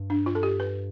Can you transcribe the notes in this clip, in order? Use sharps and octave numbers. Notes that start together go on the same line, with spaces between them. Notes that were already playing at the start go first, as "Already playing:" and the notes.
Already playing: G2
D4
F4
A4
G4
B4